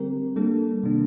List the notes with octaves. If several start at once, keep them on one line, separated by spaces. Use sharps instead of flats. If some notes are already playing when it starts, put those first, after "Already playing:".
Already playing: D3 G3 C4 G4 A#4
G3 A#3 D4 A4
C3 D#3 A#3 D4